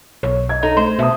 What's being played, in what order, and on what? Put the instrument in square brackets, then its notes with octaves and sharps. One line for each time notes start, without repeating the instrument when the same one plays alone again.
[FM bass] B1 [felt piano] C#5
[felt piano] D#5 G#6
[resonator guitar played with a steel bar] D#4 [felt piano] A4
[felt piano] A3 [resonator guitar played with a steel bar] C5
[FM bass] B2 [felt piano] E5 A5 D#6